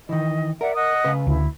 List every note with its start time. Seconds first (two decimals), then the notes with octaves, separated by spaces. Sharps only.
0.09 D#3 E3 D#5
0.61 A#4 D5 E5 F#5
0.75 D#5 F#5 D#6
1.05 C#3 B4
1.27 D2 E4